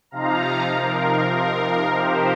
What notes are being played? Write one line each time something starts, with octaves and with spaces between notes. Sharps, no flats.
C3 F3 D#4 F5 A#5
A#4
A#4
G4 C5